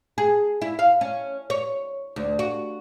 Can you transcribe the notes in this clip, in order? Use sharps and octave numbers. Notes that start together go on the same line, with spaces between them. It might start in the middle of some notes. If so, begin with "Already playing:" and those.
G#4
E4
F5
C#4
C#5
D2
F#4